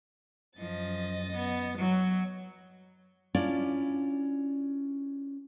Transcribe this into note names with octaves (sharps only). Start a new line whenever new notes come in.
F#2 F3 D#5 A6
B3
F#3
C#4 D4 E4 F4 D5